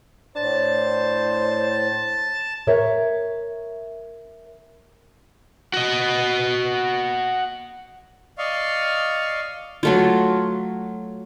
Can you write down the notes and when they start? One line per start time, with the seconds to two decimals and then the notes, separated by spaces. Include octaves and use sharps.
0.36 A2 D4 C5 A5
2.67 A#4 C#5 E5
5.74 F#4 D#5
8.38 D5 D#5 F5 C#6
9.83 F#3 A3 F4